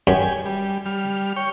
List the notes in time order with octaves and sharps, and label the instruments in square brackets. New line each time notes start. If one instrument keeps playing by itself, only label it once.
[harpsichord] F#2 [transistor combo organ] G4 G#5
[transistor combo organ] G3
G3 F6
C#5 G5